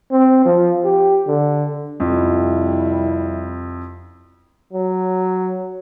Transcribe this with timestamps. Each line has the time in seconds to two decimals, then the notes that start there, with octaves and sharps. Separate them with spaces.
0.11 C4
0.45 F3
0.84 G4
1.28 D3
2.00 C2 F2 G3 E4
4.73 F#3